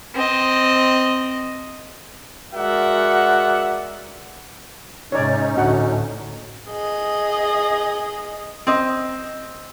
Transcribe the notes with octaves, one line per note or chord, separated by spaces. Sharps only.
C4 D#5
G#3 F#4 A#4 D5 E5 F#5
G#2 C3 C#4 D#4 C#5 D5
D2 A2 D4 F#4 F#5
G#4 D#5
C4 D#5